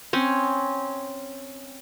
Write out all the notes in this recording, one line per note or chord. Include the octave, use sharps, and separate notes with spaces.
C4 C#4